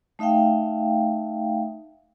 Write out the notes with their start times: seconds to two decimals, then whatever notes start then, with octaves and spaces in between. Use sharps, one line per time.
0.19 A3 D#4 E5 F5 G5